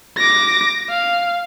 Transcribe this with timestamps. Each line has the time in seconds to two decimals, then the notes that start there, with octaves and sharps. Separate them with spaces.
0.17 D6 A#6
0.89 F5